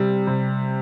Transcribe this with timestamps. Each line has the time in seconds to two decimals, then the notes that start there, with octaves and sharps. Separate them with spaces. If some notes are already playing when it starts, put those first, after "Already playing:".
Already playing: C3 G3
0.27 C3